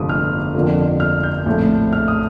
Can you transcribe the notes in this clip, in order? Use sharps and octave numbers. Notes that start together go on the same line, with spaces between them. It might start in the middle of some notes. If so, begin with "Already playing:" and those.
Already playing: G1 F2 C3 F3 A3 D6 D#6
F6
F2 D3 F3 A#3
F6
G6
A#1 A2 A3 C4
F6
D#6